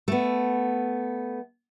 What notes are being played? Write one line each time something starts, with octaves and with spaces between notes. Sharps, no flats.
A3 B3